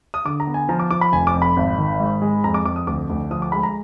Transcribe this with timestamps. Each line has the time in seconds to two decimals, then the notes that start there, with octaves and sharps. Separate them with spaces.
0.14 D#6
0.25 D3 D6
0.40 A#5
0.47 B3
0.54 G#5
0.69 F3 A#5
0.80 D6
0.91 F3 D6
1.01 B5
1.12 F1 G#5
1.27 D6
1.34 F2
1.42 B5
1.57 G#1
1.78 D#3
2.00 G#2
2.22 G#3
2.44 F2 A#5
2.54 D6
2.65 F2 D6
2.76 D#6
2.87 D2 D6
3.10 D2
3.31 F3 D#6
3.42 D6
3.52 G#3 B5
3.63 A#5